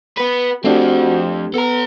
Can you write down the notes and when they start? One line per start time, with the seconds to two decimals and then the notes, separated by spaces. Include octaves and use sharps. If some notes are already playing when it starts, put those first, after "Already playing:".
0.17 B3 B4
0.64 F2 A3 C4 D4 F#4 G4
1.54 B3 A4 A#5